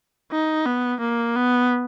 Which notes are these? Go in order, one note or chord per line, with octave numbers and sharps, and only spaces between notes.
D#4
B3
A#3
B3